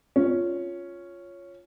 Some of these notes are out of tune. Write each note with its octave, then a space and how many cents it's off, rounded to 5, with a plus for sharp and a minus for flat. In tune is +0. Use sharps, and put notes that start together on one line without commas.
C#4 +0 F4 +0